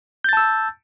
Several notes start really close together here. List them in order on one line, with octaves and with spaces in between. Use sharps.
G6 A6 A5 E6